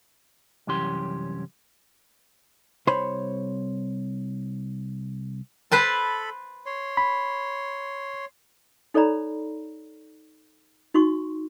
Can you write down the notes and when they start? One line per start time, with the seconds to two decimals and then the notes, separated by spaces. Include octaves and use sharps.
0.67 C2 F#2 E3 C#4 G4 C6
2.87 C2 C5 C#5 B5
5.72 A4 B4 C5 A5 B5
6.66 C#5 C6
6.97 B5
8.94 D#4 A4 C#5 D5 A#5 B5
10.94 D#4 F#4 C6 C#6